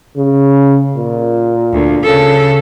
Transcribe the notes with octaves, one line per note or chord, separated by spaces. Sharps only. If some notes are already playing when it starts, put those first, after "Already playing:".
C#3
A#2
D2
C#3 A4